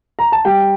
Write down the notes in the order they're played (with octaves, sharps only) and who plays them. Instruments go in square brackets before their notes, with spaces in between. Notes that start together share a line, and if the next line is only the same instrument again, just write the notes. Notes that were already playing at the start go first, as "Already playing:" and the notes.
[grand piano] A#5
A5
G3 G5